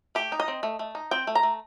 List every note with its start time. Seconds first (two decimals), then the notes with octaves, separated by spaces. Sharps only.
0.15 A3 G4
0.32 D#4
0.40 D#5
0.48 C4
0.63 A3
0.79 A3
0.95 D#4
1.11 C4 G5
1.27 A3
1.35 A#5
1.43 A3